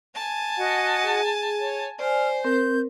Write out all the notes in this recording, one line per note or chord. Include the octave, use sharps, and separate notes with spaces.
G#5 A5
F#4 D#5 F#5
G#4
C#5
C5 D5 G#5 F6
C4 A#4 G6